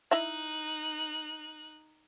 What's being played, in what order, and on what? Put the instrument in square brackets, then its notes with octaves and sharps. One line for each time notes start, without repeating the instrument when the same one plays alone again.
[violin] D#4 F#6 [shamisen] E4 D#5 E5